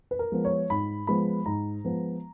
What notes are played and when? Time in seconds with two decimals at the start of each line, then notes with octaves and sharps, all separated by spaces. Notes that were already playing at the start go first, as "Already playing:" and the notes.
0.11 B4
0.19 A#4
0.32 F3 G#3 B3
0.45 C#5
0.70 G#2 B5
1.07 F3 G#3 B3 B5
1.46 G#2 A#5
1.84 F3 G#3 B3